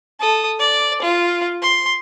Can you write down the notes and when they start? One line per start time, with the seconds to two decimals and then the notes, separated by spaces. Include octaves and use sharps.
0.20 A4 D#6
0.60 D5
1.02 F4
1.62 C6